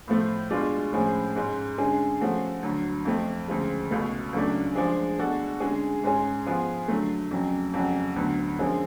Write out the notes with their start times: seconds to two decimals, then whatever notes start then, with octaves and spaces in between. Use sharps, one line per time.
0.08 A2 F3 A3
0.50 B2 G#3 D4 F4
0.93 A2 F3 G#3 C#4 G#4
1.36 G#2 G#3 C#4
1.77 D3 G#3 C#4 G#4
2.20 F3 A3 C#4 F#4 A4
2.63 D2 D3 F#3
3.05 F2 F3 A3
3.48 D2 C#3 F3 G#3
3.91 C#2 B2 A3
4.33 C#2 C#3 F#3 A3 D4
4.75 F3 G#3 D4 G#4
5.18 B2 G#3 D4 F#4 A4
5.60 D3 G#3 C#4 G#4
6.04 G#2 G#3 C#4 G#4
6.46 F3 B3 F4 G#4
6.88 D3 F#3 A3
7.31 F2 C#3 F#3 C#4
7.73 F2 C#3 F#3 C#4 F#4
8.16 D2 D3 F#3 B3
8.59 F#2 D3 F3 G#3 C#4